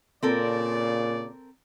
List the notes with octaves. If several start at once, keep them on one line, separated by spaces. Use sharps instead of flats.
A#2 C#3 C4 A4 A#4 D5